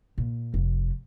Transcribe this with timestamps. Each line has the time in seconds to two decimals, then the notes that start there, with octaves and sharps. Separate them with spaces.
0.18 A#2
0.54 F1